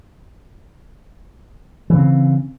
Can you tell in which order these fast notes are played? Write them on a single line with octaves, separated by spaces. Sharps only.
E3 C#3 C4